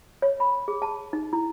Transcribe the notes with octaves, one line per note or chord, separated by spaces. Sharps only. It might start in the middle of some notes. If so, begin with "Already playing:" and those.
C#5
B5
G#4
A5
D#4
E4